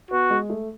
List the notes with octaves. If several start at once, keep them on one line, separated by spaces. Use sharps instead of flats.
B3 F#4
G#3
A3